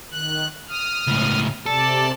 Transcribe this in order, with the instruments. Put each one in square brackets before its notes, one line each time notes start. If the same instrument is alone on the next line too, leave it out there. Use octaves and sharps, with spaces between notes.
[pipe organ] D#3 F#6
D#6 F6
[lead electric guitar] C#2 A2
[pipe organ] C3 D5 A5 [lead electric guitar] A4